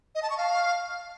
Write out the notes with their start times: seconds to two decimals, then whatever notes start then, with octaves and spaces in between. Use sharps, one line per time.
0.15 D#5
0.23 A5
0.30 C#6
0.38 F5